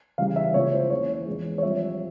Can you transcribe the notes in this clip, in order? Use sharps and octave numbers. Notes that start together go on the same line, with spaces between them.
E2 C#3 E3 G3 F5
E5
C#2 C#3 E3 A#3 F4 C#5
C5
E2 E3 A#3 C#4 C#5
E2 E3 G#3
C#5
A#1 A#2 G3 C4 F4 E5